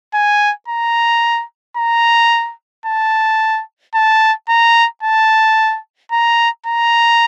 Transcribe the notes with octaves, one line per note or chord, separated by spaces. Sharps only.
G#5
A#5
A#5
A5
A5
A#5
A5
A#5
A#5